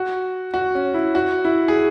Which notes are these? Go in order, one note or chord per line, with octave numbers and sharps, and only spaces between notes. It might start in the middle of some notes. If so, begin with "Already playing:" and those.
Already playing: F#4
F#4
C#4
E4
F#4
E4
G#4